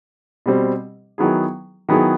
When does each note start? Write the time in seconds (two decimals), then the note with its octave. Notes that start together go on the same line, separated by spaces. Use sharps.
0.46 B2 G3 C4
1.18 D#3 F#3 B3 E4 G#4
1.89 D#3 F#3 B3 E4 G#4